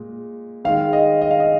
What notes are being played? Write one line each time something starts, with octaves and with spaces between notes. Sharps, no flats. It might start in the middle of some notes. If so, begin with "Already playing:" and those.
Already playing: A#2 G#3
D#3 G#3 F5
D#5
D#5
F5
D#5